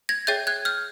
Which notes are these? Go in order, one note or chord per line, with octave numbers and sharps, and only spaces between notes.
G#6 A#6
G#4 C#5 E5 G5 G6 A6
F#6 G#6
F6 G6